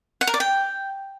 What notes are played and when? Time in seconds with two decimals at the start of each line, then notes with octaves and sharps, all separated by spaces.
0.21 F#5
0.27 A#4
0.34 D5
0.40 G5